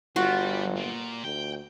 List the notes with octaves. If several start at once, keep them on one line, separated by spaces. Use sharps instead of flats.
G1 G3 F4 F#4
A#2
D2 G5